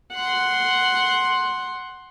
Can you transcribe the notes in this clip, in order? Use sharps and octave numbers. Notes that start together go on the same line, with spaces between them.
F#5 C6